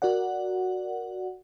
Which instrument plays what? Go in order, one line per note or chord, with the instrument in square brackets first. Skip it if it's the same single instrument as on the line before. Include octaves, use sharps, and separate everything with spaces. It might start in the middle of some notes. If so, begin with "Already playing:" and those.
[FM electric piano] F#4 A#4 D5 F#5